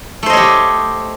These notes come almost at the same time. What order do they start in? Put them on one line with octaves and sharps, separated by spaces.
A3 C5 D#5 C#5 G4